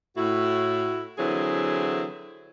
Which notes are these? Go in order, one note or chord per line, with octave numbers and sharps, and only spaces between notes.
A2 E4 F#4
D3 E3 F#3 C4 E4 G#4